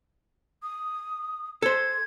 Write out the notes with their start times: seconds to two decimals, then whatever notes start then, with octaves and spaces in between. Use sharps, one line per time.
0.62 D#6
1.62 A4 C5 G#6